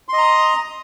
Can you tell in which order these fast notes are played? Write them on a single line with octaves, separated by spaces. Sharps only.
C6 D#5 A#5 D#6